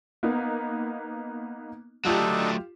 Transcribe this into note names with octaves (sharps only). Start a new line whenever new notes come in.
A#3 B3 D#4
F#3 A3 D4 D#4 F4 G4 A4